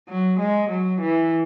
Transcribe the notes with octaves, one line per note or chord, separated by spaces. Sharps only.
F#3
G#3
F#3
E3